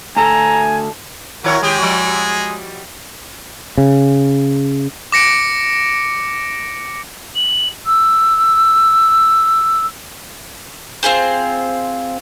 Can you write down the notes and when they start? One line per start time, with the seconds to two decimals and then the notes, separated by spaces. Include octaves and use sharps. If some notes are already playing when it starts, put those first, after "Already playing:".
0.17 D2 A4 G#5 A#5
1.44 D#3 E4 F#4 A#4 C#5
1.62 D#3 G#3 G4 G#4
1.78 F3 G3 F#4
3.78 C#3
5.12 D6 A#6 C#7 D7
7.35 F#7
7.86 E6
11.03 C4 F4 G#4 C5